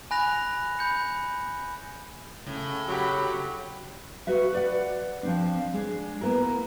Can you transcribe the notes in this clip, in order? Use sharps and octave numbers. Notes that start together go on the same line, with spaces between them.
G#5 B5 F#6 A#6 F7
B5 G6 C#7
A2 C#3
F#3 G4 B5
F#4 B4 E5
B4 D5 F#5
F3 C4 D4
G#3 D4
A#3 B3 E4 A#4